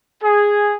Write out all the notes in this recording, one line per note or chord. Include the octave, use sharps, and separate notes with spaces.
G#4